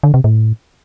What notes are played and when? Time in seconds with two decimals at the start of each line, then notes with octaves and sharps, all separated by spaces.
0.03 D3
0.14 C3
0.24 A2